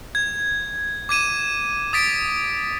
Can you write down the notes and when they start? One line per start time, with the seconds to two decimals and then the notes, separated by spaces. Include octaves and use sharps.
0.15 G#6
1.09 D6 G#6 D#7 E7
1.93 D#6 A6 B6 D7